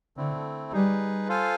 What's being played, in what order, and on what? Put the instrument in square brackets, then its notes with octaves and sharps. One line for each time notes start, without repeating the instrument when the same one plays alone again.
[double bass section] D3 [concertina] A3 C4 E4
[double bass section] G3 [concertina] D#4 G#4 B4
[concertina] F4 A4 C5 F5 G#5